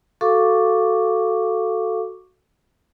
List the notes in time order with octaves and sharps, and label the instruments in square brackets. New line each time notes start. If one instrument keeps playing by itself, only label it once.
[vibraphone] F#4 A4 F5 C#6 D6